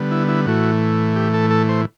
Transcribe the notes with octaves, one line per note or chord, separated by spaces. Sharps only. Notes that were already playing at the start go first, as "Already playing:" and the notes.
Already playing: D3 G3 B3
E4
E4
A2 E3 A3 F#4
G4
A4
A4
C5